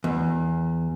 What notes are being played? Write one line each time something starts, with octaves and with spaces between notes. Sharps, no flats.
E2